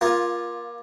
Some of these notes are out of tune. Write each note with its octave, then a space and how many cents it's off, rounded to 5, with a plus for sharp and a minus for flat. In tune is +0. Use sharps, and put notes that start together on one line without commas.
A#3 +25 F4 +0